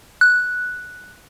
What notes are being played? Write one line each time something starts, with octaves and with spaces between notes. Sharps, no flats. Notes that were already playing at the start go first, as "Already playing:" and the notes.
F#6